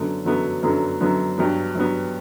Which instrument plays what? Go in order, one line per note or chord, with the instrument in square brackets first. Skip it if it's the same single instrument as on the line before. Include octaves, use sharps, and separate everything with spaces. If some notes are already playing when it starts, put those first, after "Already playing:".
Already playing: [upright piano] F#2 D3 F#3 B3
F#2 D3 F#3 B3
F#2 D3 F#3 B3
F#2 D3 F#3 B3
G2 F#3 B3
G2 F#3 B3